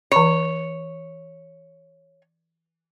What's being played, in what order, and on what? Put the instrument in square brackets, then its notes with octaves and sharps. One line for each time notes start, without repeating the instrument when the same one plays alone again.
[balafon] E3 B5 [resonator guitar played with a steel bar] C#5